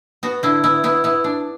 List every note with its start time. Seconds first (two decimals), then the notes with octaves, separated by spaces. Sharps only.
0.23 B3 F#4
0.43 D3 E4
0.64 B3 E4
0.84 B3 E4
1.04 B3 E4
1.24 D4